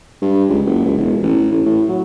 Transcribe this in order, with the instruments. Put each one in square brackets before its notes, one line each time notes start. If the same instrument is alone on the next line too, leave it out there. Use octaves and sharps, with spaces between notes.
[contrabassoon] G2
C#2
F#1
C#2
E1
A1
A1
A2
F#3